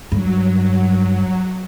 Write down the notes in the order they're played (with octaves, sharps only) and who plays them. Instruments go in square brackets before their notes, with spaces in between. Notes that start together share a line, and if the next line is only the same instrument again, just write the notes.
[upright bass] G2 [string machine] F#3